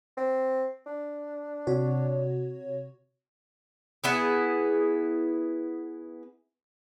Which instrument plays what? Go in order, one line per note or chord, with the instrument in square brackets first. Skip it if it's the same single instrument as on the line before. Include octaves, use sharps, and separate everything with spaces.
[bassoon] C4
D4
[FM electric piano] C3 F#4 C#5
[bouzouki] B3 E4 G#4